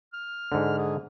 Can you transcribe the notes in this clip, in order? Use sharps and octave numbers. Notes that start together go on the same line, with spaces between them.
F6
G#2 D3
G#4